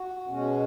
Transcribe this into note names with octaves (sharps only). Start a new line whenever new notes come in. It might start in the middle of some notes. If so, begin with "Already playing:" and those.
Already playing: F#4
B2 G#3 C#4 F#4